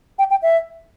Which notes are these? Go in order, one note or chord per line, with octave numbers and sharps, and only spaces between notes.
G5
G5
E5